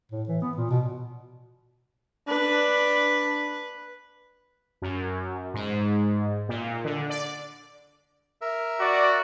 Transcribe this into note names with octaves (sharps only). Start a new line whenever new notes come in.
A2
E3
B3
A#2
B2
D4 B4
F#2
G#2
A#2
D3
D5
A#4 E5
F#4 D5